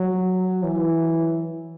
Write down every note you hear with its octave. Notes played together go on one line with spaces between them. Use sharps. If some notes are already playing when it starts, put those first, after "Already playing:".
Already playing: F#3
E3